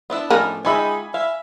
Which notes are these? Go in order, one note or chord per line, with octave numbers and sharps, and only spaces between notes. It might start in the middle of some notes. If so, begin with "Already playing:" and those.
B3 D4 E4
A2 F3 C#4 D#4 A#4
G#3 D#4 F4 G4 E5 G#5 B5
E5 F5